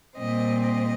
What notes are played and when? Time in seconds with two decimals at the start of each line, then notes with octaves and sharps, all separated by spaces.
0.17 A#2 G3 C4 D#5
0.64 D#5